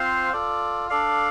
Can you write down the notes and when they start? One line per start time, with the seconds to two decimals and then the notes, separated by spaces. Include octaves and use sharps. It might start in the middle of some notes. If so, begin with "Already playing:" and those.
Already playing: C4 F4 C5 F5
0.33 F4 A4 D5
0.90 D4 A4 D5 F5